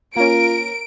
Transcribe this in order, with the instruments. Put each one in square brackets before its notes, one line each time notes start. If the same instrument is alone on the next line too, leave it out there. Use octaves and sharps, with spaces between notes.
[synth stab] A#3 C#4 [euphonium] F4 [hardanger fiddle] A#4 [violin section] D7